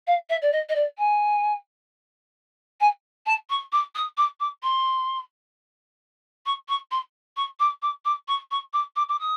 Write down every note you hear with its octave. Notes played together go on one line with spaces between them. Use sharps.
F5
E5
D5
D#5
D#5
D5
G#5
G#5
A5
C#6
D6
D#6
D6
D6
C6
C#6
C#6
C6
C#6
D6
D6
D6
C#6
C#6
D6
D6
D6
D#6